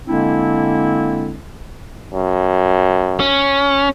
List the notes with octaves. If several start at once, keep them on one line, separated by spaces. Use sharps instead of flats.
D3 G#3 A#3 C4 D4 E4
F#2
C#4